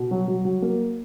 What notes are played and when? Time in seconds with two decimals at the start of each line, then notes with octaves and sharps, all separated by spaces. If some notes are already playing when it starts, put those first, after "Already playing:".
Already playing: B2
0.11 F#3
0.28 F#3
0.45 F#3
0.62 A#3